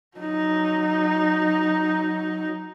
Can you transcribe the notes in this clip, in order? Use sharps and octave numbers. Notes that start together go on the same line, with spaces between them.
F#3 D#4